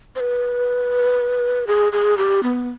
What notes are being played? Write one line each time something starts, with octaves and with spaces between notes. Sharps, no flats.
C5
B4
G#4
G#4
G4
B3